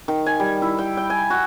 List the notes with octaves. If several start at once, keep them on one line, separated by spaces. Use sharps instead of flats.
D#3
G#5
G3
E4
G5
G5
G#5
F#4